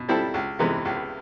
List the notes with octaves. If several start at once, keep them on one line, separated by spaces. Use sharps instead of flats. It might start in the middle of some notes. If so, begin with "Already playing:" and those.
Already playing: B2
G3 C4 E4 A4
C#2
C3 E3 G#3 B3
C#2